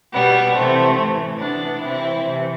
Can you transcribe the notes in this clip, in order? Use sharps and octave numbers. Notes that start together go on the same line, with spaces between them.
B2 G3 B3
C3 E3 A3 C4
A2 E3
C3 E3 B3 D4
C3 E3 C4 E4
C3 E3